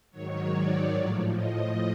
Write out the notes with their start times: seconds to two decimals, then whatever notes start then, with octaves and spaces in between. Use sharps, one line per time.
0.11 G#2 D#3 F#3 C#5
0.51 D5
0.93 A2 F3
1.33 D#5